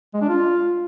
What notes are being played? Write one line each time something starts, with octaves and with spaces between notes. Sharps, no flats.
G#3
D4
F4